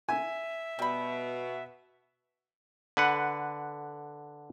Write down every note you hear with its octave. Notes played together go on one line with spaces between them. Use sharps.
E5 G#5
B2 G3 B5
D3 B4 F#5